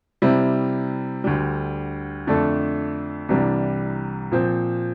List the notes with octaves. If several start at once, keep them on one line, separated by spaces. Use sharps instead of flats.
C3 G3 C4 E4
D2 D3 G3
F2 D3 A3 D4 A4
C2 C3 E3 G3 D4
A#2 F3 C4